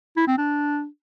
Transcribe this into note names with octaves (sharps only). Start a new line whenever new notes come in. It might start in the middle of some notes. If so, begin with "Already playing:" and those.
E4
C4
D4